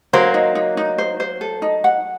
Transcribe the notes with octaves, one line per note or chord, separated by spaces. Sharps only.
F#3 A#3 C5
D#4
D#4
D#4
C5
C5
A4
D#4
F#5